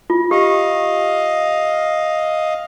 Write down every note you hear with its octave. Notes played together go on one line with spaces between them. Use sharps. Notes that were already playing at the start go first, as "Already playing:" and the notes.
F4
G4 D#5 F5